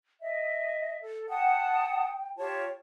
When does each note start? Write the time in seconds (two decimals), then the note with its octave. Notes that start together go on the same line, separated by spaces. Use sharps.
0.22 D#5 E5
1.02 A4
1.29 F#5 G5 A5 D#6
2.38 F4 G4 C#5 A5